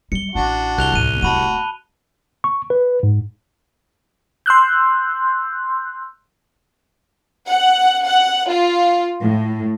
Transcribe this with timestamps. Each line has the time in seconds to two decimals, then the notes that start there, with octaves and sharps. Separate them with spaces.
0.12 G3 C#7 G7
0.35 A1 D4 E4 F#4
0.78 C2 F#6 F7 G7
0.92 D2 A2 F#6 D#7
1.22 D1 A3 F#4 A5 B5 D#7
2.44 C#6
2.70 B4
3.03 G#2
4.46 C6 E6 F#6 G6
7.46 F#5
8.04 F#5
8.48 F4
9.20 A2